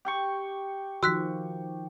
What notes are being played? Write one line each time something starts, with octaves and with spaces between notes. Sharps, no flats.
G4 G5 C#6
D#3 F3 F#4 E6 F#6 B6